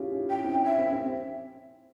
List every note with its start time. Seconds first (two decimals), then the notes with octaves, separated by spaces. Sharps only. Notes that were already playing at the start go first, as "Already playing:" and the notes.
Already playing: C#4 E4 F4 G4 G#4
0.12 C#4
0.30 E4 G5
0.37 C#4
0.44 C4 E4
0.54 C#4
0.66 E5
0.78 C4
0.92 C4